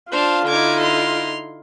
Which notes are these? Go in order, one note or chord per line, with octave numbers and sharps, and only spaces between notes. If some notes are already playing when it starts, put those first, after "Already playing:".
D4 F4 C5 F5 A5
D3 D#4 E4 D6 G#6
C6 F7